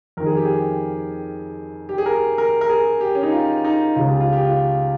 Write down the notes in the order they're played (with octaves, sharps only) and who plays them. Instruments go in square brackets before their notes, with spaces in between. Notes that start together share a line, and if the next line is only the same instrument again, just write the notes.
[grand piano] F2 D#3 A#4
G#4
G4
G#4
G4
G#4
A#4
A#4
A#4
G#4
G4
C#4
D#4
F4
D#4
C#2 C#3 F4
G4
F4
G4
F4